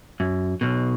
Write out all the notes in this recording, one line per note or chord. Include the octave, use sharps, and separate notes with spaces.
F#2
B1 B2